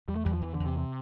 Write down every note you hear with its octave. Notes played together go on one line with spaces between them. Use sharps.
E2 G3
A3
E2 G3
F3
E2 E3
D3
E2
C3
C3